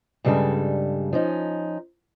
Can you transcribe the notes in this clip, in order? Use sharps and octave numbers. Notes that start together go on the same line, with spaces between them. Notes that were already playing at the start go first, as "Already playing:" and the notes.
G2 C#3 G3 G#3 A4
F3 C#4 D#4